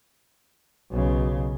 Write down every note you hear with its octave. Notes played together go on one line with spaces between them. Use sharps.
B1 C#3